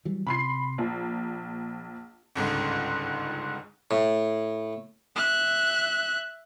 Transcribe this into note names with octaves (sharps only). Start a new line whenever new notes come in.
E3 F#3 G3
C3 B5 C6 C7
A#1 F3
G1 C#2 G#2 C#3
A2
E5 F#6